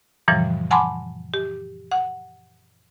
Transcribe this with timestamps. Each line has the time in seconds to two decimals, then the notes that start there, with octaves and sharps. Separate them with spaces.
0.28 F#2 A#2 C#3 E3 F3 G3
0.71 F#5 G#5 A5 B5 C6 D6
1.34 G4
1.91 F#5